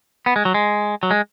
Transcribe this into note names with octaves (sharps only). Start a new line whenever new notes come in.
B3
G#3
F#3
G#3
F#3
G#3